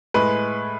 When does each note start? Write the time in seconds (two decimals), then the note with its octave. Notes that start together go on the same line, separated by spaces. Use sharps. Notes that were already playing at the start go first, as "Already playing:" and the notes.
0.14 A2 G#3 B4